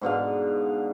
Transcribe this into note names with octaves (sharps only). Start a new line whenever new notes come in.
G#2 B2 D3 F5